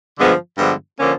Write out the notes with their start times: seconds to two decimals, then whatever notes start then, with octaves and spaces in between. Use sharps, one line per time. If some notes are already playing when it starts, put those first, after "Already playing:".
0.19 G2 D3 F3 G#3 B3
0.58 G2 D3 F3 G#3 B3
0.98 D3 F3 A#3 C#4